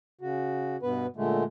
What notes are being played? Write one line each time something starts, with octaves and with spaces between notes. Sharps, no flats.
C#3 F#4
G2 B2 B3 B4
A#2 D3 G#3 A3